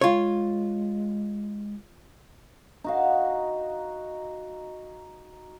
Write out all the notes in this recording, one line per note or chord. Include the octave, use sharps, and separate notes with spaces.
G#3 F4 C#5
D#4 F#4 F5